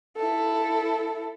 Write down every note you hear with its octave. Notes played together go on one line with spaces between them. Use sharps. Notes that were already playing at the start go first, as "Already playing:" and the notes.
E4 A4